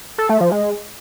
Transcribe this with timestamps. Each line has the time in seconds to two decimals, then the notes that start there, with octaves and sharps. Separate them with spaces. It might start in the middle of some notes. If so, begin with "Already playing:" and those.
0.18 A4
0.29 A3
0.40 F3
0.52 G#3